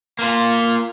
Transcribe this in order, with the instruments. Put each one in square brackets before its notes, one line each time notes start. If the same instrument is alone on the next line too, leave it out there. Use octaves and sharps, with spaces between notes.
[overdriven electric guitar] A#3 F4